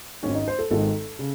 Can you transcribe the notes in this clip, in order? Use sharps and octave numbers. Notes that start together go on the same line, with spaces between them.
G#1 G#2 D#3 C#4
D#4
C5
A4
G#1 G#2 D#3 A4
C#3